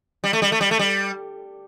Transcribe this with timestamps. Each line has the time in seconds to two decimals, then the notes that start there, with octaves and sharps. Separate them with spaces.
0.24 G3
0.33 A3
0.42 G3
0.52 A3
0.61 G3
0.71 A3
0.79 G3